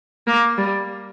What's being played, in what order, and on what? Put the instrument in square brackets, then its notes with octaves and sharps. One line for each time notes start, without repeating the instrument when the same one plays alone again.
[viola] A#3
G3